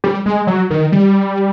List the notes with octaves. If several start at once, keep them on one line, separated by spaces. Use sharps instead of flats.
G3
G#3
F#3
D#3
G3